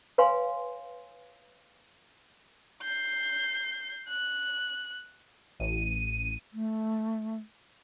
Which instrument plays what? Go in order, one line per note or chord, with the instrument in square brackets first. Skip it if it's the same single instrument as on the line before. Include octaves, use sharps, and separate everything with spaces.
[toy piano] B4 C#5 F5 G#5 C6
[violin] G6 C7
F#6
[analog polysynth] A1 D#7
[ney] A3